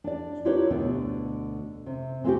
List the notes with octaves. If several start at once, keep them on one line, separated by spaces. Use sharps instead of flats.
D4 D5
E4 F4 G4 A#4 B4 C#5
D2 B2 D3 B3 D4
C3
G#3 B3 C4 E4 F#4 G4